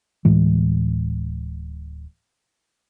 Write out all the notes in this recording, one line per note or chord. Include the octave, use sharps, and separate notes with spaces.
D1 A2 E3 G#3